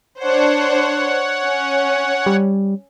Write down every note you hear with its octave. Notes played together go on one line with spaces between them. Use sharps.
D4 C5 C#5 F#5
C#4
G3